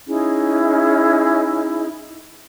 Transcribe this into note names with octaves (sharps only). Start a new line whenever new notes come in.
C#4 D#4 E4 G#4